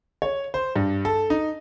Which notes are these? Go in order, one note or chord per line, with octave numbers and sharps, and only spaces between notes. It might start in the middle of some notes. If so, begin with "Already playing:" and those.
C#5
C5
G2
A4
D#4